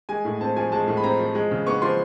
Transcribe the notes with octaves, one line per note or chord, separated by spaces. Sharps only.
G#3 G#5
A2
C4 A5
F3 G#5
G#3 A5
A2
B5
C4 A#5
F3
G#3
C#3
B3 C#6
F3 C6